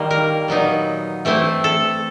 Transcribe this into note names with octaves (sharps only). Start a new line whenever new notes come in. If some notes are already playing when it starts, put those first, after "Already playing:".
Already playing: D#3 G3 A#3
A#4
A#2 F#3 B3 D#4
E3 A3 C4 E4
A4